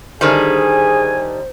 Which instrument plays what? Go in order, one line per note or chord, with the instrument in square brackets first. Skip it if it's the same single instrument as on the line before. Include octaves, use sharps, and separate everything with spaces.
[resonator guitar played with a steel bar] D3 D#3 G3 [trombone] G#4 [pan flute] C5 [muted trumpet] G#5